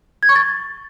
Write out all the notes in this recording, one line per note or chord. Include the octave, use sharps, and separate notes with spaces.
G#6
C#6
A6